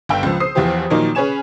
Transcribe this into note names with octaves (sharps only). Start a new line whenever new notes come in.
G1 F5 G5 E6
C#2 F3
C5 D#6 C7
E2 E3 F3 F4 G4 C5
A#2 D#3 F3 F#3 A#3 D#4
C#4 G#4 B4 C#5 G#5 E7